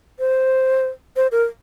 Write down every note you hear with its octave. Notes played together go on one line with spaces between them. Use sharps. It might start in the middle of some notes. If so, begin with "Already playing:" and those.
C5
C5
A#4